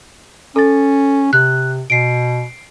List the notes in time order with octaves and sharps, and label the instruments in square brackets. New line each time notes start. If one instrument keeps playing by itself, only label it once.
[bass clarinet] C#4 [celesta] A4 A6
[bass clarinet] C3 [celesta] F#6
[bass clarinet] B2 [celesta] C7 D7